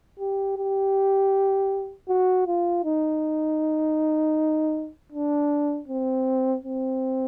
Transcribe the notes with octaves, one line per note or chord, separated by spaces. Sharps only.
G4
G4
F#4
F4
D#4
D4
C4
C4